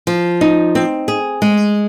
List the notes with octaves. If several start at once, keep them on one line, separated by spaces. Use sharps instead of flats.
F3
D#4
C4
G#4
G#3